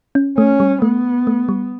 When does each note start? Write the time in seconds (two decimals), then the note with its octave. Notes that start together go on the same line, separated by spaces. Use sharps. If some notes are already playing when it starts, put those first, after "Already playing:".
0.15 C#4
0.37 A3 C#4
0.60 G3
0.82 A3 B3
1.27 A3
1.49 G3